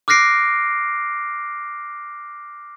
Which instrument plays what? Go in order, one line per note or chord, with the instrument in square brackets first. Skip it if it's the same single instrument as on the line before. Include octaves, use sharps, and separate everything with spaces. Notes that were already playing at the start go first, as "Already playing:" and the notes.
[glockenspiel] D6 F6 F#6 A#6 C7 D7